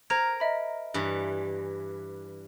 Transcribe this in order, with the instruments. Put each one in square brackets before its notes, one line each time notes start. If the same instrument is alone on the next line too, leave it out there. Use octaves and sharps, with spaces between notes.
[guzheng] A#4 [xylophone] C5 A#5 G#6
[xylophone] D#5 E5 B5
[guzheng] G2 E3